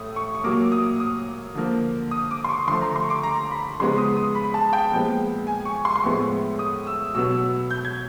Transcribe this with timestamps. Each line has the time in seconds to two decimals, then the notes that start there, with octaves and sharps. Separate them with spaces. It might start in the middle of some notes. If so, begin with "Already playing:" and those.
Already playing: A2 A3 D#6
0.16 C#6
0.35 C#6
0.44 A#2 F#3 A#3 D6
0.72 D#6
1.00 D#6
1.55 D3 F3 A#3
2.11 D#6
2.31 D6
2.44 C6
2.49 C#6
2.67 D3 F3 A3 C6
2.81 A#5
2.96 C6
3.03 C#6
3.10 D6
3.23 A#5
3.51 B5
3.79 C#3 F3 G#3 B3 C6
3.98 D#6
4.16 D#6
4.35 B5
4.54 A5
4.73 G5
4.92 A#2 F3 G#3 B3
5.47 G#5
5.65 C#6
5.85 C6
5.96 C6
6.02 A2 F3 G#3 B3 C#6
6.59 D#6
6.87 E6
7.14 B2 F#3 B3 E6
7.71 G6
7.85 G#6